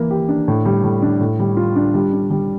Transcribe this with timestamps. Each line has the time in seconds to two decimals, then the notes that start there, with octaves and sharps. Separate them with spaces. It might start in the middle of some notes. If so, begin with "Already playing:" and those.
Already playing: E3 A#3
0.11 G4
0.29 D4
0.48 A2
0.65 G3
0.84 A2
1.02 D4
1.20 A2
1.39 G3
1.57 F4
1.76 D4
1.94 G3
2.13 D4
2.30 G3